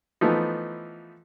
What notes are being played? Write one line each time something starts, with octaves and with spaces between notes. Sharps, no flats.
E3 F3 A3 B3 D#4